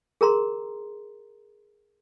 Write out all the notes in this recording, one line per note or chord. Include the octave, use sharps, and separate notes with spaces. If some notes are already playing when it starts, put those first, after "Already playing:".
G#4 A#4 A#5 C6